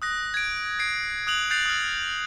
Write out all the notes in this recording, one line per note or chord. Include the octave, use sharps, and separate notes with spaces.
D#6 F#6 A#6
G#6 D7
G#6 C7 D7
D#6 F#6 F7 F#7
F#6 G6 A6 C7 F7
D#6 F6